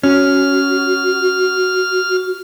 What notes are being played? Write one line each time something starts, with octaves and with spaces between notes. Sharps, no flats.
C#4 F#4 F6